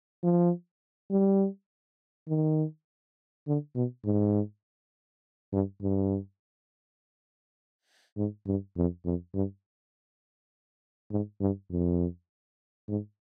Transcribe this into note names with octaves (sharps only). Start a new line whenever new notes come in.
F3
G3
D#3
D3
B2
G#2
G2
G2
G#2
G2
F2
F2
G2
G#2
G2
F2
G#2